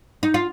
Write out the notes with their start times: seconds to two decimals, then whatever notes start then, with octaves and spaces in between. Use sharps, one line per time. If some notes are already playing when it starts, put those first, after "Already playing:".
0.23 D#4
0.34 F4